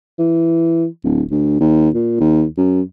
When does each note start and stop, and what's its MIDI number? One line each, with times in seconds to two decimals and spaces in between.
0.19 0.86 52
1.04 1.22 26
1.31 1.58 38
1.60 1.89 39
1.95 2.18 46
2.20 2.44 39
2.57 2.81 42